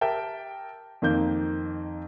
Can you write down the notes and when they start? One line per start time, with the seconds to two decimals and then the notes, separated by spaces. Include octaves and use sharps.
0.01 G4 A#4 E5 G5 A5
1.02 F2 D#3 A#3 D#4 G6